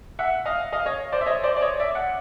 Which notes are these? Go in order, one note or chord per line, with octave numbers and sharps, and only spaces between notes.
E5 F#5
D#5 F5
D#5 F5
C#5 D#5
C5 D5
E5
C#5 D#5
C5 D5
D5
C#5 D#5
D5 E5
F#5